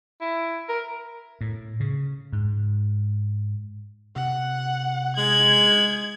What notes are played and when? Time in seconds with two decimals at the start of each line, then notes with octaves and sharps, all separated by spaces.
0.21 E4
0.69 A#4
1.41 A2
1.80 C#3
2.33 G#2
4.16 C3 F#5
5.17 G#3 G#6 F#7